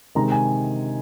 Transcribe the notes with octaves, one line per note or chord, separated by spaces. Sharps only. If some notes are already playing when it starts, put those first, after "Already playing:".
C3 D#3 G#3 A#5
G#5